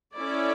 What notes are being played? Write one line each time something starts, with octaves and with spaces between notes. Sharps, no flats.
C#4 E4 A4 D5